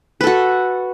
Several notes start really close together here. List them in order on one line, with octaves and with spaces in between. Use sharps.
B4 A4 F#4